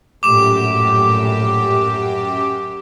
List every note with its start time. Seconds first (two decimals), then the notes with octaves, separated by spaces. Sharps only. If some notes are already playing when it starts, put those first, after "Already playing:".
0.23 A#1 F#2 A2 G4 D6 E7